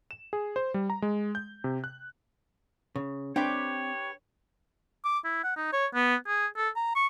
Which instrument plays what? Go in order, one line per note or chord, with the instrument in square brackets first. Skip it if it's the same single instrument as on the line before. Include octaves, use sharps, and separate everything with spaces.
[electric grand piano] E7
G#4
C5
G3
A#5
G#3
G6
C3
F#6
[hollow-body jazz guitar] C#3
[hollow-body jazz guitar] C4 [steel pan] D4 [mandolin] G4 B4 G5 [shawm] C#5
[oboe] D6
E4
F#5
D#4
C#5
B3
G#4
A4
A#5
C#6